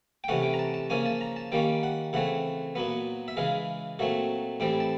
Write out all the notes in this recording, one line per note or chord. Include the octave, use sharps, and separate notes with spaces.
G5
C3 E3 A3 C#4 F#5
G5
A#5
A5
A5
C#3 F3 A#3 C#4 G#5
A5
A#5
A5
D#3 G3 A#3 C#4 G5
F#5
C#3 E3 A3 C4 F#5
A#2 F#3 B3
E5
C#3 E3 G#3 F5
A#2 F#3 A3 C4
A2 E3 G3 C4 G5
A5